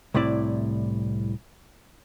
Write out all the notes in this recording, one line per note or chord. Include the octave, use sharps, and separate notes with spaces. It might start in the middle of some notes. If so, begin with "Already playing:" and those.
C2 A2 C3 E4 D5